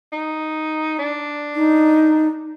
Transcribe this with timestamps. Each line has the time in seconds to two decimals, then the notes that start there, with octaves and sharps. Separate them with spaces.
0.12 D#4
0.99 D4
1.55 D#4